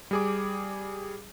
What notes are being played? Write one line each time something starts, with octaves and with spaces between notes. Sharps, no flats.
G3 G#4 D6